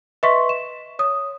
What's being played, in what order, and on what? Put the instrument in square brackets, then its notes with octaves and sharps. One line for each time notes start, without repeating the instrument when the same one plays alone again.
[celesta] B4 D#5 E5 C6 C#6 B6
E7
C#5 D#6